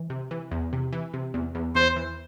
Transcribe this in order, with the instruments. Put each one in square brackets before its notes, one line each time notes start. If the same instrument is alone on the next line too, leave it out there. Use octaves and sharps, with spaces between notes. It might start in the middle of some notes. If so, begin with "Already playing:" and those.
Already playing: [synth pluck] E3
C3
E3
E2
C3
E3
C3
E2
E2
[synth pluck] E2 [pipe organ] C5
[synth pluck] E3